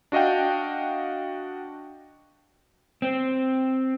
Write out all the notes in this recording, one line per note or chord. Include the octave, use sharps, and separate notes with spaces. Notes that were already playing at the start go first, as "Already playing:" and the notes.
D4 F#4 D#5 F5 G5
C4